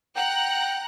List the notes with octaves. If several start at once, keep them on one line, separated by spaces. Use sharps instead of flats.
F#5 G5 A#5 F#6